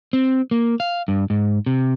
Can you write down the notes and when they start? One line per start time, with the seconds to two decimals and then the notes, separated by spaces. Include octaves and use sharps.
0.13 C4
0.51 A#3
0.80 F5
1.08 G2
1.30 G#2
1.66 C3